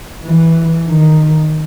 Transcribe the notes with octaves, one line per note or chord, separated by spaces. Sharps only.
E3
D#3